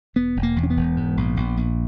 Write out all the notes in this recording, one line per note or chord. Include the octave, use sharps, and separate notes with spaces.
E1 B3
E1
A#3
E2
C#4
B3
E1
G#2
A#1
A#1
A#1